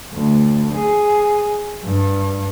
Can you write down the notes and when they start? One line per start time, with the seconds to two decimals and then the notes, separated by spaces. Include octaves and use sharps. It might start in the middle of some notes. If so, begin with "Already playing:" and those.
0.12 D2
0.75 G#4
1.85 G2